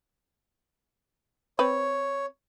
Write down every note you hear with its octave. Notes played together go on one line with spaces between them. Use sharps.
C4 B4 C#5